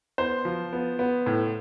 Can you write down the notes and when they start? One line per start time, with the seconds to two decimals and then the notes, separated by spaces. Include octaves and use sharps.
0.18 B3 C5
0.45 F3
0.73 B3
0.99 B3
1.26 A2